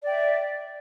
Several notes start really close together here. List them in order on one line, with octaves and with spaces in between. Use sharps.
D5 G5 E5